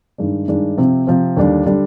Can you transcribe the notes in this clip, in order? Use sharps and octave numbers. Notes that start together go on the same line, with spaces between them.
G2 D#3 G#3 D4
G2 D#3 G#3 D4
C3 F3 C4
C3 F3 C4
D#2 D3 G3 D4
D3 G3 D4